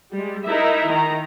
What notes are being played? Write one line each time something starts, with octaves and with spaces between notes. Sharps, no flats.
G3 G#3
D#4 E4 A#4 E5
D#3 A#5